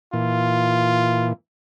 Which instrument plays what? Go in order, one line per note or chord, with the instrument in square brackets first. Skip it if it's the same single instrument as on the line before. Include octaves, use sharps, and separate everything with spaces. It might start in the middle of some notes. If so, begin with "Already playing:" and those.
[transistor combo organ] A#2 E3 [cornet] F4